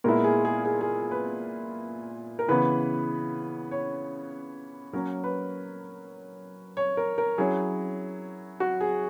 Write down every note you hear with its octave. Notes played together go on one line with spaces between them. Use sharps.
A#2 G#3 B3 E4 A#4
G#4
G#4
G#4
G#4
B4
A#4
C#3 E3 B3 B4
C#5
F#3 A#3 C#4 A#4
B4
C#5
A#4
A#4
F#3 C#4 E4 G#4
F#4
G#4